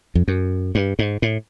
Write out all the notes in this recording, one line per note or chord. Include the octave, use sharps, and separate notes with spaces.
F2
F#2
G2
G#2
A2